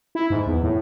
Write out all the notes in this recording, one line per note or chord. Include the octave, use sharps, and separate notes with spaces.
E4
G#2
E2
A2